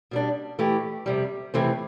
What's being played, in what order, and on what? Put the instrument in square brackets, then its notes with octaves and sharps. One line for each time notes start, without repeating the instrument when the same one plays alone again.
[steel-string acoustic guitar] B2 G3 D4
E3 A3 E4 G4
F2 C3 G3
F2 C3 E3 A3 C4